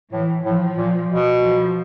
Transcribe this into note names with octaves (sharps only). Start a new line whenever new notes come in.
A2 E3
A2 F3
A#2
B2
F3